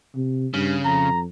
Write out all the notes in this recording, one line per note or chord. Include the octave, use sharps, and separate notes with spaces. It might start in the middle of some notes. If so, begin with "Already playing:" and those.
C3
G2 C#3
F2 A#5